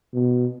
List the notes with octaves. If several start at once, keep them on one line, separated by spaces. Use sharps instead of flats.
B2